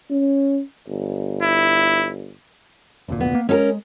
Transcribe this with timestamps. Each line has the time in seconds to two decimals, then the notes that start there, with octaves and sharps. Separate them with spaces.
0.10 C#4
0.87 G1
1.43 E4
3.08 F1 D2 A#2
3.20 B3
3.35 A#3
3.49 G#3 C#4 A4 A#4